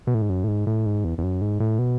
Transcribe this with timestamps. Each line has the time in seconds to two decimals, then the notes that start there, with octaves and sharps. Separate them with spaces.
0.07 B2
0.14 A2
0.22 G#2
0.29 F#2
0.44 A2
0.48 G#2
0.67 A2
0.86 G#2
1.04 E2
1.18 E2
1.23 F#2
1.41 G#2
1.60 A2
1.79 B2